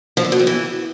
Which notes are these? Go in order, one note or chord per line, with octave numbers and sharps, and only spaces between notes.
F3
D3
B2
F2
E3